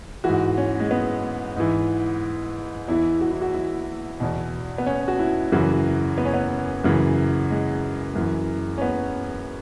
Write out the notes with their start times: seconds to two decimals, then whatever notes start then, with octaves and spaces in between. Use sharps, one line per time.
0.24 G#2 E3 F#4
0.57 C#4
0.80 G#3
0.91 B3
1.56 G#2 E3
2.88 E2 E3 E4
3.21 F#4
3.31 E4
3.41 F#4
3.54 E4
4.20 E2 B2
4.78 B3
4.86 C#4
5.08 F#4
5.19 E4
5.52 F#2 C#3 E3 F#4
6.18 B3
6.25 C#4
6.33 B3
6.84 F#2 C#3 E3
7.51 G#3
8.16 F#2 E3
8.78 C#4
8.82 B3